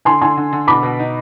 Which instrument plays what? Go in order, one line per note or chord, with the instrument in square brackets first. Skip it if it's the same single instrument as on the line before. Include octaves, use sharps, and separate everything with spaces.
[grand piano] D3 [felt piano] G#5 C6
[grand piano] D3 [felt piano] G#5 C6
[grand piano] D3
D3
[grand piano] B2 [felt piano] B5 D6
[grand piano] B2
D#4